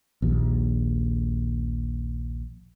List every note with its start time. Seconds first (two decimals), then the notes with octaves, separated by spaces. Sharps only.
0.22 A#1 D#2